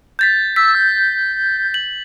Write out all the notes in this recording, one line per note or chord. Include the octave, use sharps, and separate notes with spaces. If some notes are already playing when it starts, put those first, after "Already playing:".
G6 A6 B6
E6 B6
G6
F#7